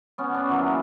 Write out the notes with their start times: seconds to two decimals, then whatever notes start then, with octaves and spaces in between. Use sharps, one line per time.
0.18 B3 C#4
0.34 B3 D4
0.49 E3 F#3 A#3